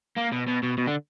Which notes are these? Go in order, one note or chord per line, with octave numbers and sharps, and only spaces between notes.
A#3
B2
B2
B2
B2
D3